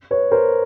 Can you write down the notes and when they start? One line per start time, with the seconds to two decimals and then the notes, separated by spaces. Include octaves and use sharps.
0.11 B4 C#5
0.31 A#4 C5